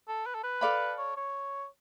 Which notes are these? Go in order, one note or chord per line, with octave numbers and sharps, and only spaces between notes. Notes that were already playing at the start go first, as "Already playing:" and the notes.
A4
B4
A4
B4
A4 D5 F5 B5
C#5
C#5